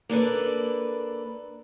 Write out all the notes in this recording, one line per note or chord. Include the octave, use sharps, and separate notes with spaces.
A#3 D4 A4 B4